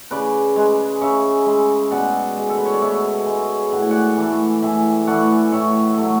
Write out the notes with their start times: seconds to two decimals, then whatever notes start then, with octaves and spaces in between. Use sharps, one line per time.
0.11 C#3 B4 D5
0.56 G#3
1.01 C#3 C#5 E5
1.46 G#3
1.91 B2 D5 F#5
2.37 G#3
2.49 A4
2.58 B4
2.65 C#5
2.74 D5
2.82 B2 C#5 E5
3.26 G#3
3.72 A2 F#5
3.82 G#5
3.91 D5 F#5
4.17 E3 A3
4.62 A2 E5 G#5
5.07 E3 A3 D5 F#5
5.52 A2 C#5 E5
5.98 F#3 A3